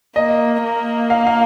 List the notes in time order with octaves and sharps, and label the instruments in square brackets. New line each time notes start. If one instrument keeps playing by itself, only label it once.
[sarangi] A#3 [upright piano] D#5
[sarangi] A#3
[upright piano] F5
F5